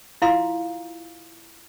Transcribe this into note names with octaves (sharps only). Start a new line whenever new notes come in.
E4 F4 F5 A#5 C6